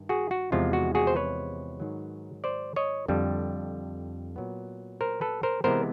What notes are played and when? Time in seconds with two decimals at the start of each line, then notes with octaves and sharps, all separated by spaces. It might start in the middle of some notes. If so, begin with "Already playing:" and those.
Already playing: G2 D#3
0.09 F#4 G#4
0.31 F#4
0.52 E2 C3 F3 G#3 F4
0.73 F#4
0.95 F#4 G#4
1.07 C5
1.16 B4 C#5
1.80 G#2 D#3 F#3
2.44 C5 D5
2.76 C#5 D#5
3.08 F2 D3 G3
4.36 A#2 F#3 B3
5.01 A#4 C5
5.21 A4 B4
5.43 A#4 C5
5.64 C3 E3 G#3 B3 A#4 C5